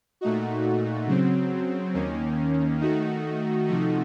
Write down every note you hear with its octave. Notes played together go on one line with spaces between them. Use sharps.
A#2 A3 D#4 F#4
C#3 F#3 C4
D#2 D#3 A#3 C#4
D#3 A3 D#4 F#4
C3 F3 A3 D#4 F#4